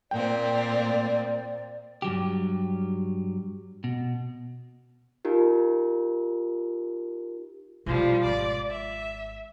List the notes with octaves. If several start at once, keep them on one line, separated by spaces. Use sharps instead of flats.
A#2 A#3 C4 D5 G5
G2 F#3 G4
B2
D#4 F4 G4 A#4
B1 F3 G3
G#1 D5
E5